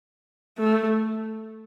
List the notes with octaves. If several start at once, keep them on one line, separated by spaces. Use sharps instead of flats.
A3